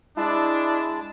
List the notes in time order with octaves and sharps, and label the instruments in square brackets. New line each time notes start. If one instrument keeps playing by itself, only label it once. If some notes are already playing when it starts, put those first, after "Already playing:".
[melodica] G#3 A5 [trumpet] D4 [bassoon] E4